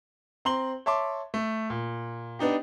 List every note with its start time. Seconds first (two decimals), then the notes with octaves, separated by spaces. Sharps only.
0.45 C4 A#5 C6 F#7 G7
0.86 C#5 E5 A5 C6 D6
1.34 A3
1.70 A#2
2.39 B3 D4 D#4 G4